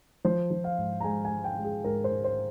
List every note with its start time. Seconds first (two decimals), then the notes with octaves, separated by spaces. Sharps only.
0.24 F3 C5
0.51 F3
0.64 F5
0.77 G#2
1.01 A#5
1.04 G#3 G#5
1.25 G#5
1.31 G#3
1.44 G5
1.57 G#3
1.64 G#4
1.84 G#2 A#4
2.04 C5
2.10 G#2
2.24 C5